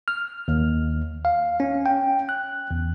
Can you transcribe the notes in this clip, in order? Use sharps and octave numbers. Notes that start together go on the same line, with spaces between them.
F6
D#2
F5
C#4
G5
F#6
E2